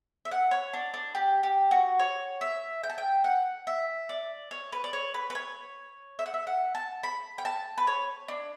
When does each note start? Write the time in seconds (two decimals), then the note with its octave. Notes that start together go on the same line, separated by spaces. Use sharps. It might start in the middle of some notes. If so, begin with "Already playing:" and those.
0.25 E5
0.31 F#5
0.51 C#5
0.73 D4
0.94 D4
1.15 G4
1.43 G4
1.71 F#4
1.99 C#5
2.41 E5
2.83 G5
2.90 A5
2.98 G5
3.24 F#5
3.67 E5
4.09 D5
4.51 C#5
4.72 B4
4.84 D5
4.93 C#5
5.14 B4
5.30 B4
5.35 C#5
6.19 E5
6.26 F#5
6.34 E5
6.47 F#5
6.75 A5
7.03 B5
7.38 G5
7.45 A5
7.78 B4
7.87 C#5
8.28 D4